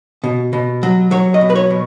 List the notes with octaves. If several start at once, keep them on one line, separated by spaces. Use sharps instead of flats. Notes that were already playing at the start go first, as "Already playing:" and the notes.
B2
B2
F#3
F#3 C#5
D#5
B2
B4
C#5
B2